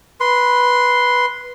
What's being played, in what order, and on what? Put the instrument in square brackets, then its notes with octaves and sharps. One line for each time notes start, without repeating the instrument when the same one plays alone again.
[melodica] B4 C6